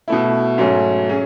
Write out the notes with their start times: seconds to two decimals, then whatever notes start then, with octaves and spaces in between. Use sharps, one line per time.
0.08 B2 A3 E4
0.58 G#2 F#3 A3 C#4
1.09 F#3 C#4 G#4